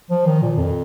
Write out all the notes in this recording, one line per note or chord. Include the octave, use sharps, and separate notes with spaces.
F3
D#3
A#2
F2